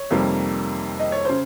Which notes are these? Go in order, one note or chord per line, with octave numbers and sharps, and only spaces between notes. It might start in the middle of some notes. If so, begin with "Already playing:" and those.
Already playing: C#5
F2 C3 D#3 G3 A#3
D#5
C#5
C#3 C5